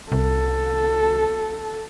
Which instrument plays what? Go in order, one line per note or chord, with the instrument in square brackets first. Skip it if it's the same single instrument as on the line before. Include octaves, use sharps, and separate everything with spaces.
[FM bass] C2 [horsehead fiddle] A4